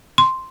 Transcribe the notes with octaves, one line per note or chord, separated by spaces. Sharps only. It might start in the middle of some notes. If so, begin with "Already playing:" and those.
C6